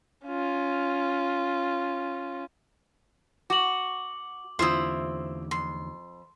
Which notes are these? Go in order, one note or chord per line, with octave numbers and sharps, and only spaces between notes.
C#4 F4
F#4 D6 F#7
E2 D3 C4 E4 F4 C5 D#6
F2 C6